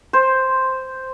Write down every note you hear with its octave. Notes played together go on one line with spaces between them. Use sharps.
C5